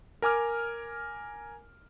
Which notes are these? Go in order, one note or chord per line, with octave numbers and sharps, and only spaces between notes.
A#4 G#5 D6 F6